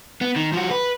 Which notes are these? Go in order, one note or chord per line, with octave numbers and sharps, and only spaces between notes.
B3
D#3
F3 F#4
B4